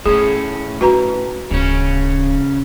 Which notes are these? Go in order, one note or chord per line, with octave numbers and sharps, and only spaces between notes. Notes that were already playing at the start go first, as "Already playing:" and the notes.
A2 A3 C#4 G#4
D#4 F#4 B4 A#5
D1 C#3 C#4